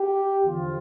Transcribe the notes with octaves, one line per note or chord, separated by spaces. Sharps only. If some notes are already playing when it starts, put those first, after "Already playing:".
Already playing: G4
E2 D3 F3 F4